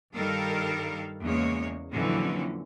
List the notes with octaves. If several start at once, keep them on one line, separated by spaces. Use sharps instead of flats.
G2 D#3 G3 A4 A#4 F5
E2 C#3 G#3 A#3 C#5
F2 A#2 D3 E3 F#3 C#4